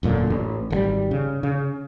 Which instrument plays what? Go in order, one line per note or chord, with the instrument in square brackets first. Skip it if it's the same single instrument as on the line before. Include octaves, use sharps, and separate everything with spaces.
[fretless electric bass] E1 F#2 A#2 D3
A1
G#1 C#3 G3
C#3
C#3